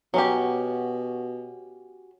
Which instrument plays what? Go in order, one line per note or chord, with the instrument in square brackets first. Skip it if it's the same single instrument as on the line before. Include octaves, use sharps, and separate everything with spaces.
[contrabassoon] B2 [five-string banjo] F#3 C#4 G4